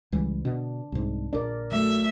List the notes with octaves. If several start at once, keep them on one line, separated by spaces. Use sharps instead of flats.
C#2 E3 G3
B2 D4
C2 G#2
A#1 D4 A#4 D5
F#3 A3 E5